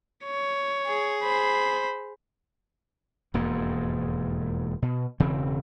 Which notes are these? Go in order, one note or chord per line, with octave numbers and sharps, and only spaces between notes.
C#5
G#4
C5 B5
E1 F2 G#2 A#3
B2
E1 C#3 E3 C4